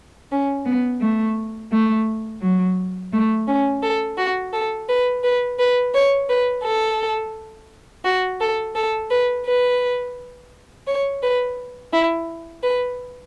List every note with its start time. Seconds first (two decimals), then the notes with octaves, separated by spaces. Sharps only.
0.31 C#4
0.65 B3
1.01 A3
1.71 A3
2.41 F#3
3.12 A3
3.47 C#4
3.82 A4
4.17 F#4
4.53 A4
4.88 B4
5.23 B4
5.59 B4
5.94 C#5
6.29 B4
6.64 A4
8.04 F#4
8.40 A4
8.75 A4
9.10 B4
9.46 B4
10.86 C#5
11.22 B4
11.92 E4
12.62 B4